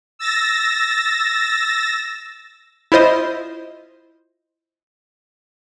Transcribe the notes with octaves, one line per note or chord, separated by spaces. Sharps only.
E6 A6 A#6
E4 F4 C5 D#5